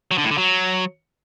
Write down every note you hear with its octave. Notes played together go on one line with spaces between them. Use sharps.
F#3
D3
A2
D3
F#3